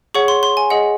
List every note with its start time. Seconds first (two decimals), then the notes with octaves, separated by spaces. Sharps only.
0.14 G#4 C#5 F#5 C#6
0.28 C6
0.43 C6
0.57 G#5
0.70 G#4 D#5 F#5